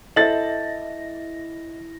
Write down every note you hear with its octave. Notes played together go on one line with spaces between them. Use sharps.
E4 A4 C5 D#5 E5 A6 A#6 F#7